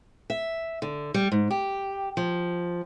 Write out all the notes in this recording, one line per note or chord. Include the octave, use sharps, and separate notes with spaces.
E5
D3
G3
G#2
G4
F3